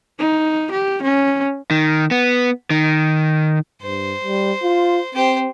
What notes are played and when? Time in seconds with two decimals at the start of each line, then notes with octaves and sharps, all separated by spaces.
0.19 D#4
0.71 G4
1.02 C#4
1.71 D#3
2.11 B3
2.71 D#3
3.82 G2 C5
4.24 G3
4.63 F4
5.15 C4 G4 C5